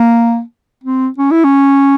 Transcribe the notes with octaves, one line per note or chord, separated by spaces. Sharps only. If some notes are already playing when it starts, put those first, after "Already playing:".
Already playing: A#3
C4
C#4
E4
C#4